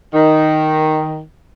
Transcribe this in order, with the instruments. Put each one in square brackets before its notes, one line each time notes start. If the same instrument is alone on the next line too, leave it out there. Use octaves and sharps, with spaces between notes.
[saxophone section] D#3